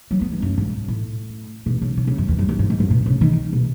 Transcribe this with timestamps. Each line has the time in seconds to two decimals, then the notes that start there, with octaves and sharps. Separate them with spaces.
0.11 F#3
0.21 B3
0.32 E3
0.42 F#2
0.57 G#2
0.88 A2
1.66 B2
1.82 C#3
1.97 C#3
2.07 C#3
2.18 F#2
2.28 E2
2.39 F#2
2.49 F#2
2.59 G#2
2.70 G#2
2.80 F#2
2.90 B2
3.06 C#3
3.21 D#3
3.52 B2